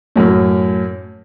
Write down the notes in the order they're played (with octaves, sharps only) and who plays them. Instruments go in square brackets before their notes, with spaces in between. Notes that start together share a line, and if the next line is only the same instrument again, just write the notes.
[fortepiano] F#2 A2